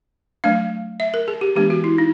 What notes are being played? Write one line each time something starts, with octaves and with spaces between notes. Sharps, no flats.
F#3 A3 D4 F5
E5
A#4
G#4
G4
E3 G#3 B3 D4 G4
F#4
E4
D#4